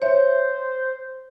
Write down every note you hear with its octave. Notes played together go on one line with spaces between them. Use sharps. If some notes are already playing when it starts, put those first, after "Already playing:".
C5 C#5 E5